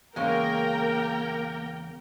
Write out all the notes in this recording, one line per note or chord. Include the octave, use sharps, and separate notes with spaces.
E2 C#3 G#3 A#3 A#4 G5